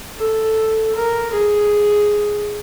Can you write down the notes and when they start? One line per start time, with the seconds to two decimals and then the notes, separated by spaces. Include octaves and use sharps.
0.17 A4
0.95 A#4
1.34 G#4